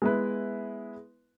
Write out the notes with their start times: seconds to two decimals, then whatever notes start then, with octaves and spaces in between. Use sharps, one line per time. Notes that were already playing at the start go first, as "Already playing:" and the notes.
0.02 G#3 B3 E4 B4